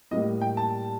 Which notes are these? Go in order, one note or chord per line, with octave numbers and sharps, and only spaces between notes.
A2 G3 A#3 D#5
G5
A5